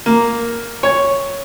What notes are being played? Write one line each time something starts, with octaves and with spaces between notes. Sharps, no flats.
A#3
C#5